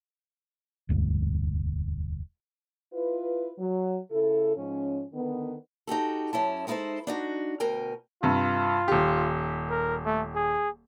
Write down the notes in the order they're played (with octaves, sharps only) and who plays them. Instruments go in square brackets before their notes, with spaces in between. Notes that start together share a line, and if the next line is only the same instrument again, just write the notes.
[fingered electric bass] E1 D2 G2
[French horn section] E4 F4 B4
F#3
C#3 E4 A4
G#2 F3 C#4
D3 D#3 B3
[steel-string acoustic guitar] D#4 F#4 G4 A4
F#2 C#4 E4 A5
G#3 B3 D#4 E4 A4 C5
D4 D#4 F#4
D2 B2 A#4 G5 G#5
[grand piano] G2 C3 [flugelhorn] F4
[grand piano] D#1 G4
[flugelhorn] A#4
A3
G#4